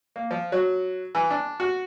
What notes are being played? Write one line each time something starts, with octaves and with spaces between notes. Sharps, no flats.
A#3
F3
F#3
E3
D4
F#4